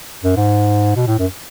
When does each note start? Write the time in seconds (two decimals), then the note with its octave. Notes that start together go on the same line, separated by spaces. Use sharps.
0.23 F#2
0.36 G#2
0.96 B2
1.07 A2
1.19 F#2